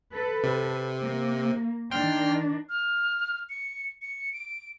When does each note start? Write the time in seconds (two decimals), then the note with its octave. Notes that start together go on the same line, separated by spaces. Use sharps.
0.11 A4 B4
0.44 C3
1.01 A#3
1.91 D#3 D4 G5 C6 F6
2.69 F6
3.49 C#7
4.02 C#7
4.33 D7